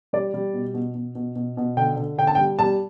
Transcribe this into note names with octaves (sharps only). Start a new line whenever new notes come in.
G3 D5
G3
B2
B2
B2
B2
B2
B2
D3 G5
D3
D3 G5
A5
G5
G3
G3 A5